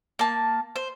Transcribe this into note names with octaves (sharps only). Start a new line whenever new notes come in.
A#3 A5
C5